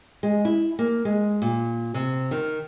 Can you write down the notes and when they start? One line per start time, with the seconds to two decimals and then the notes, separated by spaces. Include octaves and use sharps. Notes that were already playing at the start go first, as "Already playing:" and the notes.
0.23 G#3
0.45 E4
0.79 A#3
1.05 G#3
1.42 A#2
1.94 C3
2.31 D#3